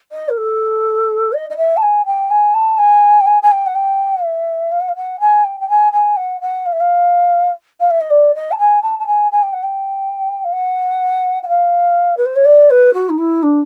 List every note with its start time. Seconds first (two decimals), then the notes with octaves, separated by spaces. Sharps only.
0.12 D#5
0.29 A#4
0.37 A4
1.33 D#5
1.50 D#5
1.57 E5
1.77 A5
1.82 G#5
2.06 G5
2.31 G#5
2.54 A5
2.78 G#5
3.21 G5
3.26 G#5
3.43 G#5
3.52 G5
3.66 F#5
3.75 G5
4.24 E5
4.72 F5
4.81 F#5
4.89 F5
4.96 F#5
5.20 G#5
5.44 G5
5.60 G5
5.69 G#5
5.93 G#5
6.17 F#5
6.41 F#5
6.66 F5
6.72 E5
6.80 F5
7.80 F5
7.90 E5
8.01 D#5
8.10 D5
8.35 D#5
8.52 A5
8.59 G#5
8.82 A5
8.99 A5
9.07 G#5
9.32 G#5
9.43 G5
9.53 F#5
9.63 G5
10.45 F5
10.53 F#5
11.43 F#5
11.48 F5
12.17 B4
12.26 C5
12.36 C#5
12.45 D5
12.70 B4
12.94 F#4
13.09 D#4
13.18 E4
13.43 D4